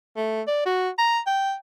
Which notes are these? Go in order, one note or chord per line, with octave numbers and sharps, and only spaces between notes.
A3
D5
F#4
A#5
G5